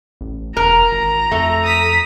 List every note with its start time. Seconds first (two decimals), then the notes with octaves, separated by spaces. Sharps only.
0.21 A1
0.57 E1 A#4 A#5
0.92 G#1
1.32 F2 A3
1.64 D#6 B6